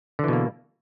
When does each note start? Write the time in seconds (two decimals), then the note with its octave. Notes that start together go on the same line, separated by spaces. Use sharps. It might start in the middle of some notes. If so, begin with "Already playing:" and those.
0.19 D3
0.24 E3
0.28 B2
0.33 A#3